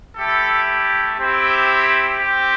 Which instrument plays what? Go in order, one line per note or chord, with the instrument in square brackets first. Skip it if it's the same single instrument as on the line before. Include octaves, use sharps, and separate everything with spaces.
[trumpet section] A3 E4 G4 A4
C4 E4 G4
C4 G4